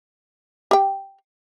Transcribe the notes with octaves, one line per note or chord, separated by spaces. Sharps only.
G4 G5